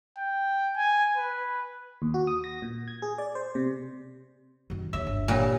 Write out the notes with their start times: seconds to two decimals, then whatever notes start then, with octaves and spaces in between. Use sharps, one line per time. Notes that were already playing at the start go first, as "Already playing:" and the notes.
0.18 G5
0.77 G#5
1.17 B4
2.02 D#2
2.14 F#4
2.27 D#6
2.44 A#6
2.62 A#2
2.88 G#6
3.02 G#4
3.18 D5
3.35 C5
3.55 C3
4.70 F#2 D#3
4.93 D#2 D3 E5
5.07 G1
5.28 A#2 G3